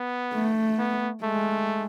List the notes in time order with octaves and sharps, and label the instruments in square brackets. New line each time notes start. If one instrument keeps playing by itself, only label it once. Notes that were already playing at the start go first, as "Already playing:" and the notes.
Already playing: [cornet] B3
[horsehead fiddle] A3
[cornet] B3
[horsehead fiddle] G#3 [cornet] A3